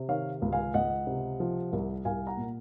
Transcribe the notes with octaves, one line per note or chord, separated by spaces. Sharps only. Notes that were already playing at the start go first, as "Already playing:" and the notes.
Already playing: C3
D#3 C#5 F5
C#2
F5 G#5
C#2 D#5 F#5
C3
F3
C2
C2 F5 G#5
F#5 A#5
A#2